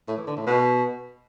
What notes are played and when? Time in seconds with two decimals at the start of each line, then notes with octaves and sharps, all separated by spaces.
0.08 A2
0.17 E3
0.27 D3
0.37 A2
0.47 B2